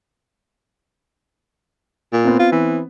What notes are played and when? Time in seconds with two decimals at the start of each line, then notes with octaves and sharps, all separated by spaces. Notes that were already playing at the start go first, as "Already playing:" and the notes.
2.13 A#2
2.25 B3 C4
2.39 F4
2.52 E3